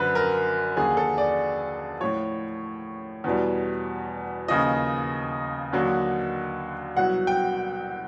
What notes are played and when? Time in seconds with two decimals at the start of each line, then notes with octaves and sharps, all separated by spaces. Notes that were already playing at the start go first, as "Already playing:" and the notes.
Already playing: F#2 D3 F3 B4 C5
0.15 A#4
0.76 D#2 D3 F3 G#4
0.97 A4
1.18 D5
2.00 A2 F3 C#5
3.24 E2 B2 G3
4.48 D#2 C#3 F3 D#5
5.73 D#2 D3 F#3
6.96 C2 B2 F#3 F#5
7.27 G5